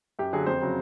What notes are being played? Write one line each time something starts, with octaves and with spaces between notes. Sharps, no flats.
F#2 G4
D3 F#3 G#4
F2 C5
C#3 F#3